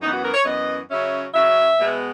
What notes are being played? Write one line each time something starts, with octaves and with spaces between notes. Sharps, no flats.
F#2 E3 B3 D#4
F#4
A#4
C#5
F#2 E3 B3 D#5
C#3 F#3 C#4 E5
C#3 F#3 C#4 E5
B2 G#3 B3